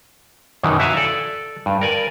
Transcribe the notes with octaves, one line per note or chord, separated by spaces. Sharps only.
F#2 B2 D#3 E3
E4 F#4 E5 F5 G#5 A5
A4 D5
G2
A#4 D5 G#5